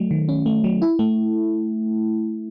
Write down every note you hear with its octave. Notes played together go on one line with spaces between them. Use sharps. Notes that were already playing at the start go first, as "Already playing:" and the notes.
Already playing: F#3 A3
D#3
C#4
A3
F#3
E4
A3